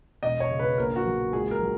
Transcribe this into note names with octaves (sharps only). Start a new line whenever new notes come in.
E1 D#5
C#5
C#3
B4
A#1 A#4
F#4
F#3
C#2 G#4
A#4
F#3